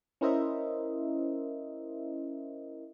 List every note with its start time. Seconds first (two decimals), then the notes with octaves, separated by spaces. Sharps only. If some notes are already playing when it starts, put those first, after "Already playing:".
0.21 C#4 E4 A#4 C5 D#5 E5